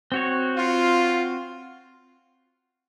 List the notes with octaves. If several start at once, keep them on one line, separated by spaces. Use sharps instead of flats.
C4 F#4 C#5
F4